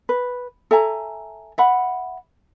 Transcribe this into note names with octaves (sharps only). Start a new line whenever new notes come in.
B4
A4 E5 G#5 A#5
E5 F#5 B5